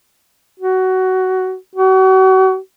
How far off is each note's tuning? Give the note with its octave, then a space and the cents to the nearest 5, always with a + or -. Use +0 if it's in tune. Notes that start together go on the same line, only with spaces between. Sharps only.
F#4 +15
F#4 +35